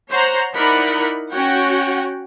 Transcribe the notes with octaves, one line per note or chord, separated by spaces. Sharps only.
C5 C#5 F#5 A#5
D#4 E4 A#4 D5 F#5 B5
C#4 F#4 C#5 F#5 G5